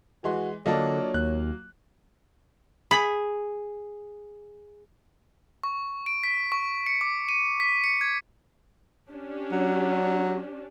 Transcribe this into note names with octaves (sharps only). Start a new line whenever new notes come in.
E3 G#3 F#4 C6
D3 F#3 A#3 D4 F4 A4 C#5 D#5
D#2 F#6
G#4 B5
C#6
D7
B6
C#6
C#7
D6
D#7
B6
C#7
G#6
C#4 D4 G4
F#3